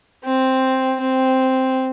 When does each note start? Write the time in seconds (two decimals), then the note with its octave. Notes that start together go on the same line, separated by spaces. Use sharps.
0.25 C4
1.01 C4